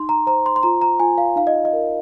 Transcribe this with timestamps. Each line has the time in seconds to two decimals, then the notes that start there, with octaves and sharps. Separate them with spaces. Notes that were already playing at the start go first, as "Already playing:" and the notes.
Already playing: D#4 C6
0.09 A#5
0.27 C5 A#5
0.46 C6
0.56 C6
0.63 F4 A#5
0.82 A#5
1.00 F4 G#5
1.18 F5
1.36 D#4 F5
1.47 D#5
1.65 D#5
1.73 A#4